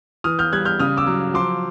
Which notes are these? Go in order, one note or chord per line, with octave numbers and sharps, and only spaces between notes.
E3 D#6 F6
F6 G6
G3 F#6 G#6
F6 G6
C#3 D#6 F6
D6 E6
F#3
F3 C6 D6